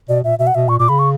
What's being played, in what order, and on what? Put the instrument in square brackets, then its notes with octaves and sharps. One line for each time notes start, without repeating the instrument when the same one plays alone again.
[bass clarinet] B2 [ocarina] D5
[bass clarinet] A#2 [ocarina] E5
[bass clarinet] B2 [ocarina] E5
[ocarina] F#5
[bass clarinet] B2 [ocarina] E5
[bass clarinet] A#2 [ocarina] C#6
[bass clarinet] A#2 [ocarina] D6
[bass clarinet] C#3 [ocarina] B5
[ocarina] C#6